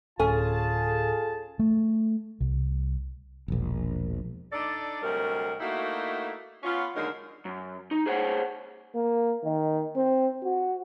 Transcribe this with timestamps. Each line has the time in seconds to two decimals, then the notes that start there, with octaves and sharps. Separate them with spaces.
0.20 D1 C#4 F4 G#4 A4 G#5 A5
1.59 A3
2.41 C2
3.48 E1 A#1
4.52 D4 D#4 A4 D5
5.01 D2 C3 F#3 G3 A#4 D#5
5.60 A3 A#3 D#4 E4 F#4
6.63 B3 C#4 F4
6.95 D#2 D3 F#3 G#3 D#4 A#4
7.45 F#2
7.91 D#4
8.06 G#4 C5 C#5 F#5
8.95 A#3
9.44 D#3
9.96 C4
10.43 F#4